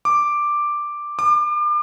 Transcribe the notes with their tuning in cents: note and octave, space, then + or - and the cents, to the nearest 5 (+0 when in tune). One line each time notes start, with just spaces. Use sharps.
D6 +5
D6 +35